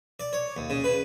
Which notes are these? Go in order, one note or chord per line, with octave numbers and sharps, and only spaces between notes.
D5
C#5
D#2
C#3
B4